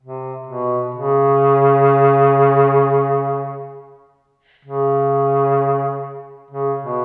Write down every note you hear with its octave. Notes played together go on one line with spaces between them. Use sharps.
C3
B2
C#3
C#3
C#3
B2